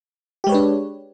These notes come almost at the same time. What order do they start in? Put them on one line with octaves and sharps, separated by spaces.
G4 G#3 C#5 B4 D4